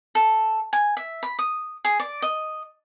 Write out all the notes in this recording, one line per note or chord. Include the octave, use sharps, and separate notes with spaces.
A4
G#5
E5
B5
D#6
G#4
D5
D#5